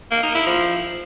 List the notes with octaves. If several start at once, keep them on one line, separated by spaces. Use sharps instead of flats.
A#3
D#4
E4
F3